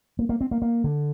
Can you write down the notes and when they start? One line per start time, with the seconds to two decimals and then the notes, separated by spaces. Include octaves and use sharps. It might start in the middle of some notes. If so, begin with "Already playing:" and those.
0.19 A#3
0.29 A#3
0.41 C4
0.51 A#3
0.62 A#3
0.84 D3